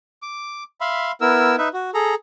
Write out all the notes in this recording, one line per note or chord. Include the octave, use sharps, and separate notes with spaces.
D6
E5 F5 B5 C6
B3 E4 A#4 E6
D#4 B4 E5
F#4
G#4 A4 A#5